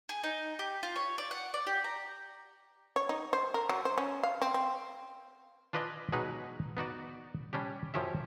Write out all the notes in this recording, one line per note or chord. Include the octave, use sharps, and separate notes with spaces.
G#4
D#4
G4
F4
C#5
D5
F#5
D5
G4
A#5
C#5
D#4
C5
A#4
F#3
C5
C#4
F5
C4
C4
D4 F4 B4 D5 D#5 G#5
B2 F#3 G#3 D#4 B4
B3 D#4 F#4 D5
G3 C#4 D4 G4
F#2 F3 C#4 G4 E5